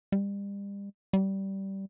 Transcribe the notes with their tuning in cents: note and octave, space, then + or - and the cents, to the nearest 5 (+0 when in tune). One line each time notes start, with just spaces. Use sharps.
G3 +35
G3 -15